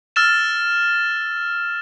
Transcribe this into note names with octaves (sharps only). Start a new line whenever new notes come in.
E6 F6 A6 E7